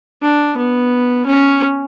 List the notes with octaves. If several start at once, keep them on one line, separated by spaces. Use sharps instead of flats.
D4
B3
C#4